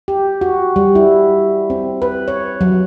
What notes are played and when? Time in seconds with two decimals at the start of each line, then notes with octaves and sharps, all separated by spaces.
0.08 G4
0.41 F#4
0.76 G3
0.95 E4
1.70 C4
2.02 B4
2.28 C#5
2.61 F#3